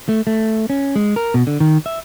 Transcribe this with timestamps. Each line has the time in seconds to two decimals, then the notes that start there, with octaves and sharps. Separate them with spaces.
0.09 A3
0.27 A3
0.70 C#4
0.96 G#3
1.16 A#4
1.34 B2
1.47 D3
1.60 D#3
1.86 E5